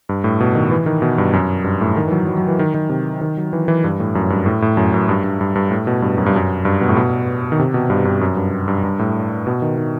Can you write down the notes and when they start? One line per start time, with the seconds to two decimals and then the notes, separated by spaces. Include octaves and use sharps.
0.09 G2
0.24 A2
0.40 B2
0.55 D#3
0.71 E3
0.86 D#3
1.02 B2
1.18 G2
1.33 F#2
1.64 G2
1.81 A2
1.96 D#3
2.07 E3
2.12 F#3
2.27 F#3
2.37 F#3
2.48 E3
2.59 D#3
2.74 D#3
2.89 C3
3.21 D#3
3.37 F#3
3.53 E3
3.68 E3
3.84 G2
4.00 A2
4.15 F#2
4.30 G2
4.46 A2
4.62 A2
4.77 F#2
4.94 F#2
5.09 G2
5.24 G2
5.41 G2
5.55 G2
5.71 A2
5.87 B2
6.02 G2
6.18 F#2
6.26 G2
6.36 F#2
6.65 G2
6.81 B2
6.89 A2
6.97 B2
7.52 D#3
7.59 C3
7.74 B2
7.90 G2
8.05 G2
8.21 F#2
8.37 G2
8.68 G2
8.84 G2
8.99 A2
9.47 B2
9.62 D#3
9.78 D#3